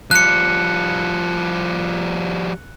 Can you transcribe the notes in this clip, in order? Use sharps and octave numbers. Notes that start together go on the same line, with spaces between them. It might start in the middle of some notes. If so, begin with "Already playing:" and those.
F3 G3 F#6 C#7